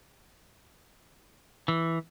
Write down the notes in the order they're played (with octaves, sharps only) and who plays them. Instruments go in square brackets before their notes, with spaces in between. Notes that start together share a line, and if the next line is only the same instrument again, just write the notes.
[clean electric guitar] E3